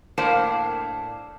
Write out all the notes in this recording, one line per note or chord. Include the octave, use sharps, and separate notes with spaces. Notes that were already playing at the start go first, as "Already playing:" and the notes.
A2 A#3 D4 A#4 C5 F5